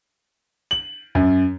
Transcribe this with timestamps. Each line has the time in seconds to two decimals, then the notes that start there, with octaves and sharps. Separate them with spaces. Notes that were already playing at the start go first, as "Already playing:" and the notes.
0.71 F#7
1.15 F#2